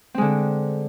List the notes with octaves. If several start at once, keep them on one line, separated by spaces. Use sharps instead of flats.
D3 G#3 C4